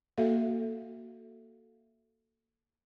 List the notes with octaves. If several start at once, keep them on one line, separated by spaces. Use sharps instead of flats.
A#3 F#4 A4 E5 F5